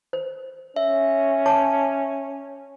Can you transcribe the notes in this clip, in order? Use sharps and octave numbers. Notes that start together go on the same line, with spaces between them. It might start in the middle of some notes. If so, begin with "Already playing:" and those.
C5
C#4 E5
C#5 A5 D6